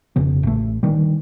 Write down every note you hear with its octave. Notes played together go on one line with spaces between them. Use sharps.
F1 C#3 B3
A1 A3
D3 D#3 G3